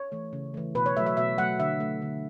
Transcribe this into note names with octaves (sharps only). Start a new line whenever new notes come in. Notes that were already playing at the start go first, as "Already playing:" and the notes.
Already playing: C#5
E3 A3
C#3
E3 A3
B2 B4
C#5
F#3 A3 E5
E5
B2 E5
F#3 A3 F#5
D3 E5
A3
D3